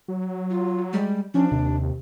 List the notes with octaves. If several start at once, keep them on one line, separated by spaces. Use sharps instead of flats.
F#3
F4
G3 G#3
F3 C#4 D4
D#2 C3